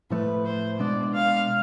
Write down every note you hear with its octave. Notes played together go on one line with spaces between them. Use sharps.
A2 F3 A3 B4
C5
B2 G#3 B3 D4 D5
F5